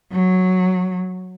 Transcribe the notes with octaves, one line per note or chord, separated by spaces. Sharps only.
F#3